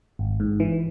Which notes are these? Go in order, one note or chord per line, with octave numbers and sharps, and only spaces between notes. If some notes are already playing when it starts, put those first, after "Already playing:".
G#1
G#2
E3